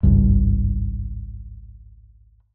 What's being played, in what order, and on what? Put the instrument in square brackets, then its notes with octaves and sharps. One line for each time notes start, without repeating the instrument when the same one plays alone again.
[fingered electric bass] G#1 C#2 G2